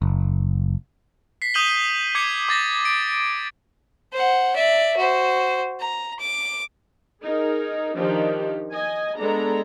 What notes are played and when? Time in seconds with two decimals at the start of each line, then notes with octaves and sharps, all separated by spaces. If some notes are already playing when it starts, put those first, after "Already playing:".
0.02 F#1
1.42 B6 C7
1.54 D#6 G6 D#7 F#7 G7
2.15 D6 G#6 C#7
2.49 D6 A6 A#6
2.85 D7
4.13 C5 F#5
4.56 D5 E5
4.97 F#4 C5
5.80 A#5
6.19 D6
7.22 D#4 G#4 A#4
7.95 D#3 F3 D4 D#4 G4
8.73 D#5 G#5
9.18 G#3 B3 D4 A4 A#5